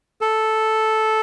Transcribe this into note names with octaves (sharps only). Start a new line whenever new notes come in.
A4